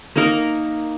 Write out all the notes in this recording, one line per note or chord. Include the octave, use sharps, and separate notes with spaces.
A#3 D#4 A#4